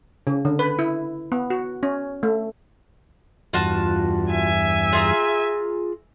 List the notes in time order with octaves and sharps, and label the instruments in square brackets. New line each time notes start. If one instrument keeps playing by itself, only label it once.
[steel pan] C#3
D3
B4
E4
B3
F#4
C#4
A3
[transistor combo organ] E2 G2 [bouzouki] F4 F#4 A5
[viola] E5 G#5
[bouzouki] F4 G#4 A#5